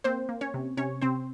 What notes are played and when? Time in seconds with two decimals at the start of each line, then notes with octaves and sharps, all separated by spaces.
0.04 A#3 C4 C5
0.29 A#3
0.41 C#4 C#5
0.54 C3
0.77 C3 C#4 C#5
1.02 C3 C4 C5